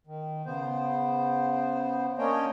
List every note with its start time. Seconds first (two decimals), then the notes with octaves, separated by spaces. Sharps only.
0.07 D#3
0.46 C#3 B3 C5
2.18 A#3 C#4 D4 C#5 D#5 G5